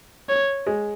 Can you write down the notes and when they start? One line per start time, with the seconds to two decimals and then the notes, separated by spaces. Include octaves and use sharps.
0.29 C#5
0.67 G#3